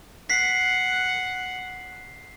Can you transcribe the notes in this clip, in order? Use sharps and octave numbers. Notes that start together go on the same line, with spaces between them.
F#5 B6 C7